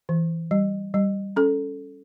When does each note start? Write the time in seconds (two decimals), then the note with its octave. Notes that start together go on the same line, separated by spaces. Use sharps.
0.09 E3
0.51 G3
0.94 G3
1.36 C#4 A4